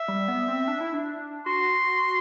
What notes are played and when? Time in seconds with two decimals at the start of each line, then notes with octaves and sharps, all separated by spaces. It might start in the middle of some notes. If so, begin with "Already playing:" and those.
Already playing: E5
0.08 G3
0.28 B3
0.48 C4
0.68 D4
0.80 E4
0.94 D4
1.46 F#4 C6